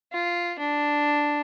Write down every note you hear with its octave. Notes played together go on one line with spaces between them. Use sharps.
F4
D4